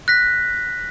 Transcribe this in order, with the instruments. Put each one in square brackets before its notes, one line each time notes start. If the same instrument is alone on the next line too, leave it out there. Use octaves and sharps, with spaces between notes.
[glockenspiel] F#6 A#6 B6